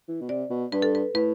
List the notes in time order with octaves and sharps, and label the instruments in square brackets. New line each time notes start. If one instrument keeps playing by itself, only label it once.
[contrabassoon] E3
B2
[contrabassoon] C3 [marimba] D5
[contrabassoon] B2
[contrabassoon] G2 [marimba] B4
[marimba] A4
B4
[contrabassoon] A2 [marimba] B4